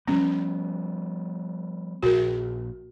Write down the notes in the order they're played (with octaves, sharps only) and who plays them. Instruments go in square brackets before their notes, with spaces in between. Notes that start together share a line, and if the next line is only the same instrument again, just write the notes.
[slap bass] F3 G3 B3 [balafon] C#4
[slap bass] A#1 [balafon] F#4 A#4